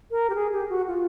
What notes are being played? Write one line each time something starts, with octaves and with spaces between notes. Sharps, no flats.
A#4
G4
G#4
G4
F#4
F4